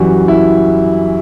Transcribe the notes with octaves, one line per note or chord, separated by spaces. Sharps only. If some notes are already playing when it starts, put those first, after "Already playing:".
Already playing: F#2 E3 G3 F#4
E4